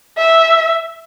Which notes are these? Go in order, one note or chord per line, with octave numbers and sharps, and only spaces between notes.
E5